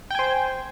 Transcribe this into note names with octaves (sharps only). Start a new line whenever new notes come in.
C5 G5 G#5